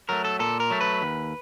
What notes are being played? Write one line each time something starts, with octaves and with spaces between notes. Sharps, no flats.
F#3 A3 A#4
A4
A#2 A4
A#4
F#3 A3
B4
D#2